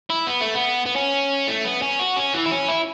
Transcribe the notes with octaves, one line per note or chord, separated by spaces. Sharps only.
E4
B3
A3
B3
B3
C#4
A3
B3
C#4
F#4
C#4
E3
E4
C#4
E4